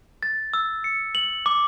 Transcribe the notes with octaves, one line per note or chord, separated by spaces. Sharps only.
A6
E6
C#7
F#7
D6